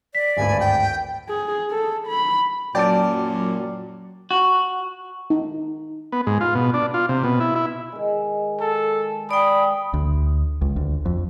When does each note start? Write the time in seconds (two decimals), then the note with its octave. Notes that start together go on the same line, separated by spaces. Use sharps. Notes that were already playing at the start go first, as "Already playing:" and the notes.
0.15 D5 B6
0.37 G#1 D2 G2 G#5
0.59 G5
1.30 G#4
1.70 A4
2.08 B5
2.75 F#2 A#2 F#3 D5 G5 A5 D6
4.31 F#4
5.30 D#4
6.12 B3
6.27 G#2
6.41 F4
6.55 B2
6.74 D4
6.94 F4
7.09 C3
7.24 B2
7.40 E4
7.56 E4
7.92 D#3 G#3
8.60 A4
9.31 D5 G5 B5 D#6
9.94 D2
10.61 C#2
10.76 D2
11.06 F2